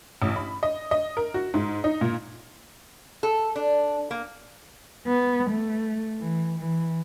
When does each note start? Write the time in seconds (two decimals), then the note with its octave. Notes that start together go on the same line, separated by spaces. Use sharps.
0.22 A1
0.36 B5
0.63 D#5
0.91 D#5
1.17 A#4
1.34 F#4
1.54 G#2
1.84 D#4
2.01 A#2
3.23 A4
3.56 D4
4.11 A#3
5.07 B3
5.50 A3
6.21 E3
6.59 E3